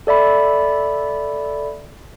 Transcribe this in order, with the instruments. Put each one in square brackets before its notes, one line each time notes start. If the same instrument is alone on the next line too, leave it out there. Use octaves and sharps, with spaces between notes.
[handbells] A4 D5 E5 B5